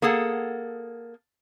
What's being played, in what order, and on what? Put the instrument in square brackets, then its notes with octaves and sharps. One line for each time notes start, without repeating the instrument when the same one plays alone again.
[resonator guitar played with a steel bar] A#3 G#4 A4 F#5 A5